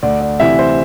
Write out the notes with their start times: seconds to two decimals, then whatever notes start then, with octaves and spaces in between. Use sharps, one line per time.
0.03 D2 D5
0.21 D5
0.40 C3 E3 E5
0.59 C5